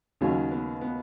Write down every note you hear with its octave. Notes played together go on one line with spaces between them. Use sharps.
D#2 C#3 F#3 C#4
B3
B3